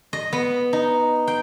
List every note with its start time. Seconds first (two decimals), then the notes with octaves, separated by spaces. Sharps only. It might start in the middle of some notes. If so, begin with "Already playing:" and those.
0.13 D#5
0.33 B3
0.73 D#4
1.27 G5